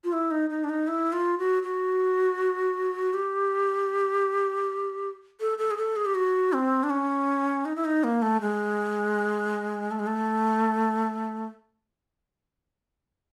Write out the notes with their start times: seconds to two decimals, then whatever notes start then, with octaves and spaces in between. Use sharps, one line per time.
0.04 F4
0.13 E4
0.31 D#4
0.50 D#4
0.64 D4
0.69 D#4
0.88 E4
1.13 F4
1.38 F#4
1.63 F#4
3.14 G4
5.40 A4
5.58 A4
5.71 G#4
5.77 A4
5.96 G#4
6.06 G4
6.15 F#4
6.53 C4
6.83 D4
6.90 C#4
7.65 D#4
7.76 E4
7.85 D#4
8.04 A#3
8.22 A3
8.41 G#3
9.91 A3
9.99 G#3
10.07 A3